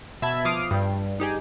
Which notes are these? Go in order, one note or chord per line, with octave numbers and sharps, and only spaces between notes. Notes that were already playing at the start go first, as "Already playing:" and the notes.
B2 E5 A5 B5 G#6
F3 D6 D#6 F6 C7
G2 G3
D#4 G4 G#4